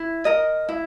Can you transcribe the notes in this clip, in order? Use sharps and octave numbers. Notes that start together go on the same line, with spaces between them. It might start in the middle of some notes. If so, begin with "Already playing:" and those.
Already playing: E4
A#4 D#5
E4